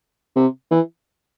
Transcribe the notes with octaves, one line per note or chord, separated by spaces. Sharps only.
C3
E3